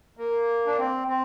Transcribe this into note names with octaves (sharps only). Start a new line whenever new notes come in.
A#3
D4
C4
C4